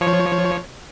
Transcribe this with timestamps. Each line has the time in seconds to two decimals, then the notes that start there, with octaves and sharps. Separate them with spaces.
0.01 F3 C#5